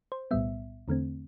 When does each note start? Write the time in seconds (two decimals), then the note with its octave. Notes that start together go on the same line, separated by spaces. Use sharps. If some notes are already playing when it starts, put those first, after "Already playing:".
0.12 C5
0.31 B1 A2 G3 B3 E5
0.88 E2 D3 A3 C4